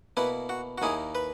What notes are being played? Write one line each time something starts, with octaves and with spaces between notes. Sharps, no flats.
B2 A#3 E4 B4
F#4
F#4
D#2 D#3 A#3 E4 G#4
B4